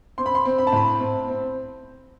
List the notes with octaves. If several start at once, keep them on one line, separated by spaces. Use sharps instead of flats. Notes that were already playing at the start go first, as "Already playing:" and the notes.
C4 C6
B5
C6
C4
B5
A5
A2 B5
C4
C4